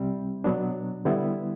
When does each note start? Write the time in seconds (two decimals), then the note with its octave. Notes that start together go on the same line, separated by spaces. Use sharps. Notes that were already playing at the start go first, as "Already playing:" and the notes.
Already playing: C2 C3 G3 C4
0.44 B2 F#3 B3 D4
1.05 D3 G3 B3 E4